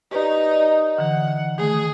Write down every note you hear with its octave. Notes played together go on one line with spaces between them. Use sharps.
D#4 G4 B4 D5
D5 D#5
D3 E3 F#5
D#3 A3 G#4